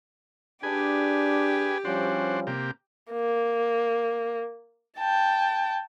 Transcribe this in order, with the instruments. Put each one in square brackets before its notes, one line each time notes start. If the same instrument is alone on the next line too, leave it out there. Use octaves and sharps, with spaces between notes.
[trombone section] D4 [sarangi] G4 [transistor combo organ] G#4 B4 G#5
[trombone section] F3 G3 C#4 [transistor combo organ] D4 F#4 C5
[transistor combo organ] C3 A#3 G4
[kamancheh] A#3
G5 A5